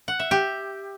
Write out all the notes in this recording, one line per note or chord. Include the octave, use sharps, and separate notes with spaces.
F#5
E5
G4